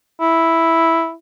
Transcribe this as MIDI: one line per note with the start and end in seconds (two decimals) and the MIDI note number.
0.21 1.13 64